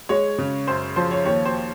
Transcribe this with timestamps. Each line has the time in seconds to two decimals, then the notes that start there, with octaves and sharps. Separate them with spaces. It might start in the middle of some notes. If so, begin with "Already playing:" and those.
0.09 G#3 C#5
0.38 C#3
0.67 F#2 C5
0.96 F3 C5
1.11 C#5
1.25 D#2 C#5
1.45 C5